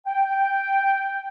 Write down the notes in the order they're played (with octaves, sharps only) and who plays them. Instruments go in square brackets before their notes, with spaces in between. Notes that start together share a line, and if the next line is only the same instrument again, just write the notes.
[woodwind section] G5